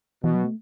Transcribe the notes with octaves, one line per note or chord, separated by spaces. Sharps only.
B2 E3
F#3
A3